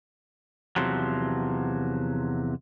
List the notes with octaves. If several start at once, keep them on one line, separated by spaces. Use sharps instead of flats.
E2 C3 F3 F#3